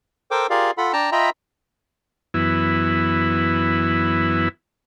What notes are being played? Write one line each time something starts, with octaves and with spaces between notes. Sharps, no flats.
A4 A#4 C5 G5 D6
F4 G4 G#4 A#4 D5 F5
F4 A4 F#5 B5
D4 G5 A5 A#5
F4 D#5 E5 G5 A#5 B5
F#2 E3 B3 E4